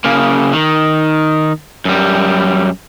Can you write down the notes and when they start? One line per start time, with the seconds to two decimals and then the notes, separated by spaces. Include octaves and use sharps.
0.04 C#3 A#3
0.53 D#3
1.85 F#2 G3